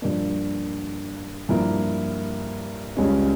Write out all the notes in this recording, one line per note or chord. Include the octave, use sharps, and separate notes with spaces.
G2 F3 A#3 D4
G2 F3 A#3 E4 A#4
C#2 C#3 G3 C#4